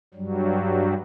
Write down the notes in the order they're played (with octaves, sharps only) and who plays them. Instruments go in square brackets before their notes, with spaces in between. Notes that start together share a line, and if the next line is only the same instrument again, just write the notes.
[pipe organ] G2 F#3 G3